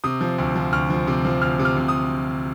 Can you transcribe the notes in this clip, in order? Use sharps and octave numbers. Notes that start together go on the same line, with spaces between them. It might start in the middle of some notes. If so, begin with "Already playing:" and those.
C3 D#6
F3
D2
F3
D2 F6
F3
C3
F3
D2 F6
C3
F6
C3
D#6